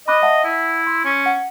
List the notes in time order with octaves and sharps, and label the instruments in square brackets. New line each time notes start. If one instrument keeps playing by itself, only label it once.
[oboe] D#5 [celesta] B5 D6 F#6
[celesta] E5 F#5 A5
[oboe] E4
[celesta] C6
[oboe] C#4
[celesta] F#5